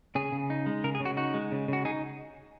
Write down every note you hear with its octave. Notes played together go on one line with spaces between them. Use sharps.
C#3 G#4
C#3
D#4
G#3
C#3 A#4
G#4
C#3
F#4
D#4 F#4
G#3
C#3
C#3 F#4
D#4 G#4